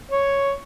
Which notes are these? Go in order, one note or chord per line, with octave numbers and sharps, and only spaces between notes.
C#5